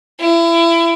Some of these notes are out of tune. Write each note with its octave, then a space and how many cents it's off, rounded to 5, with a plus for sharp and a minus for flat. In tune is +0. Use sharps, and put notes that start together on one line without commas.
E4 +30